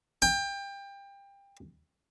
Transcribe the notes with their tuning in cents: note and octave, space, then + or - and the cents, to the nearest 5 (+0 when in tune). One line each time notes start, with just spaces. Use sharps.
G5 +25